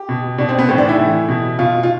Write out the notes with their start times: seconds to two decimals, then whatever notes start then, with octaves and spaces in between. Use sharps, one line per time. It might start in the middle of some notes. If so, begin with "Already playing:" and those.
Already playing: G4
0.09 B2
0.38 B2 D4
0.49 C4
0.59 B3
0.69 A2 E3 C4
0.78 D4
0.89 E4
0.99 A2 E3
1.29 B2
1.59 B2 F4
1.83 F4